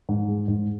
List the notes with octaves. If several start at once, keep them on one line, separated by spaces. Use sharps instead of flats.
G#2
G#3
G#2